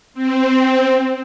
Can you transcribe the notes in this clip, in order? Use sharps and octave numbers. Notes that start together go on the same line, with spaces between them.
C4